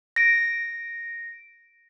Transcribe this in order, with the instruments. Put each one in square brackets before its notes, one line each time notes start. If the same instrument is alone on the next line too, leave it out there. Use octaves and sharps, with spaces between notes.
[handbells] A#6 D7